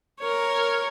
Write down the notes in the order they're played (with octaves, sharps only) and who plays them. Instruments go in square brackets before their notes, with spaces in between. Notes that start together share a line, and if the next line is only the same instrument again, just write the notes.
[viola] A#4 C#5